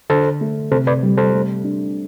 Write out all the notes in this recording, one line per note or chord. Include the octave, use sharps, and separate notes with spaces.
D3 A4 C5
A3
C3 A4 C5
B4 D5
G3
A4 C5
A3
D4